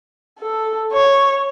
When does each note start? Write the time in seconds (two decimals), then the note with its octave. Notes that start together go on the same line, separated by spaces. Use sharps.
0.39 A4
0.92 C#5